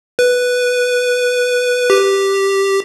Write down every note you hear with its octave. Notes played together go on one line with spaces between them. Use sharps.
B4
G4